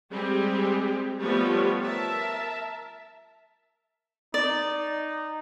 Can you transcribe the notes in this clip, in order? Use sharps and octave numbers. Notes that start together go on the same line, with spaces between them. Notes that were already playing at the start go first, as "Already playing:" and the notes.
G3 G#3 C4 G4 G#4
F3 G3 A3 B3 B4 C#5
A#4 E5 A5
D#4 D5